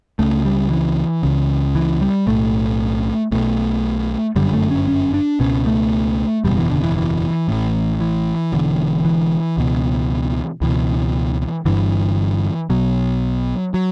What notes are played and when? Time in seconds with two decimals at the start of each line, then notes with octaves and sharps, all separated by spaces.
0.19 C#2 C#3 A3
0.45 G3
0.71 E3
1.23 C#2 C#3
1.75 E3
2.01 G3
2.27 B1 A2 A3
3.32 B1 B2 A3
4.36 G1 F#2 D3 G3
4.53 A3
4.71 C#4
4.87 C#4
5.14 D4
5.40 C#2 B2 C#4
5.66 A3
6.44 F#1 E2 B2 G3
6.58 E3
6.70 D3
6.83 E3
6.97 E3
7.48 A1 A2
8.01 E3
8.53 E1 E2 D3
9.05 E3
9.57 C#2 B2
10.61 C#2 B2 E3
11.65 G1 G2 D3 E3
12.70 B1 B2 F#3
13.74 F#3